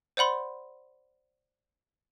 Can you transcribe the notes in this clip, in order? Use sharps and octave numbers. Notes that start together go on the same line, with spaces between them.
C5 D5 F#5 B5 C6